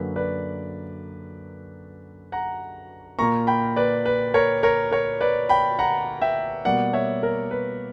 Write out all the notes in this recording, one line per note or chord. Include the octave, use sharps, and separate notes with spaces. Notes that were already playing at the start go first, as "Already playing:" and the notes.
Already playing: F#2 D3 F#3 A#3 B4
B4 D5
F#5 A#5
A#2 A#3 A#5 C#6
G5 B5
B4 D5
B4
A#4 C#5
A#4 C#5
A#4 C#5
B4 D5
G5 B5
F#5 A#5
E5 G5
B2 G3 A#3 D5 F#5
C#5 E5
A#4
B4